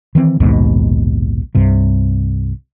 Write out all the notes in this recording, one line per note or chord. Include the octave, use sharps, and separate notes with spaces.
D#3 E3 C4
A#1 D#2 G#2 B2
C2 G2 C3